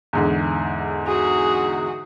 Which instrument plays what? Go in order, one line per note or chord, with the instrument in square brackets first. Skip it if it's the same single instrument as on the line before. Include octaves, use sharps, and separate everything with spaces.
[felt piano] E2 G#2 D3
[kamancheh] F#4 G#4